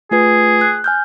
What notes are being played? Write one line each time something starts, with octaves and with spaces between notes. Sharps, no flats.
A3 F4 G#4 B4
F#6
G#5 F6 G6